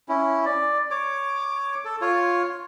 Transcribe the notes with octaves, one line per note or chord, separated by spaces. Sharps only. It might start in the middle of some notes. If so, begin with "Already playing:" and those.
C#4 E4
D5
C#5 D6
A4
F4 C#5